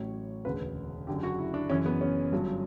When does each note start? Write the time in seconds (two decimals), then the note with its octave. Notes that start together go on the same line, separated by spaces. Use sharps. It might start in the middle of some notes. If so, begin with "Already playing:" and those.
Already playing: A1 A2 F#3 C#5
0.45 E1 D2 C#3 B4
1.07 F#1 F#2 D3 G4
1.23 F#4
1.39 E4
1.54 D4
1.70 F#1 F#2 E3 C#4
1.86 B3
2.01 C#4
2.32 G1 G2 F#3